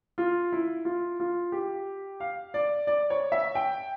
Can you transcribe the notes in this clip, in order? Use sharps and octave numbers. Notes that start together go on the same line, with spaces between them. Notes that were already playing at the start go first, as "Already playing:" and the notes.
F4
E4
F4
F4
G4
F5
D5
D5
C#5
E5
G5